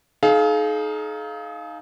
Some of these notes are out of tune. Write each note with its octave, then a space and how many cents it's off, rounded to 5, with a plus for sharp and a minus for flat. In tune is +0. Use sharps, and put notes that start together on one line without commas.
D#4 +0 G#4 +45 F5 +0